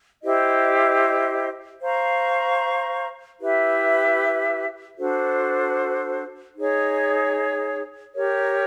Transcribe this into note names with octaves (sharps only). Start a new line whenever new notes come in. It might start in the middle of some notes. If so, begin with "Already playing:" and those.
E4 G4 C5 D#5
C5 F5 A#5 C#6
E4 G4 B4 E5
D4 F#4 A4 C5
D#4 G#4 C#5
G4 A#4 C#5